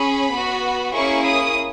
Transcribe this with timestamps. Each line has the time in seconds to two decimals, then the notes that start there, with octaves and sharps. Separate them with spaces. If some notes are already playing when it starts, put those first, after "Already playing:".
Already playing: C#4 G#4 B5
0.31 B3 F#4
0.93 A#3 C#4 E4 G#4 C#6
1.25 D#6